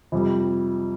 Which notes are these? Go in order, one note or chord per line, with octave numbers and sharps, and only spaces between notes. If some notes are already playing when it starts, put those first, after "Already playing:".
F2 C3 G3